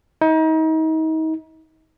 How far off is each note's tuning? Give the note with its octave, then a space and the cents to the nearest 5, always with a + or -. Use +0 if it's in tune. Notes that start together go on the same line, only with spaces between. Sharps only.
D#4 +35